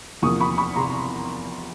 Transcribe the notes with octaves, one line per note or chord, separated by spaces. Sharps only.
E2 C3 F3 A#3 C#6 D#6
B5 C#6
B5 C#6
C3 A#5 C6